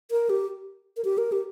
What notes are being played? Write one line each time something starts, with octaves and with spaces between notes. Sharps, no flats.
A#4
G4
A#4
G4
A#4
G4